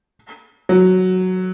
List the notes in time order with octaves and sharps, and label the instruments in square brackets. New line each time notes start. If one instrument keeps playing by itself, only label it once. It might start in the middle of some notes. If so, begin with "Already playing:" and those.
[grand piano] F#3